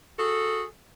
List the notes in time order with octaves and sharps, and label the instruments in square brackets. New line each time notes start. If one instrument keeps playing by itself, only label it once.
[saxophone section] F#4 G#4 A4